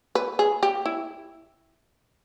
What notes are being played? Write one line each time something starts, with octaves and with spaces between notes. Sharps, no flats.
B4
G#4
G4
E4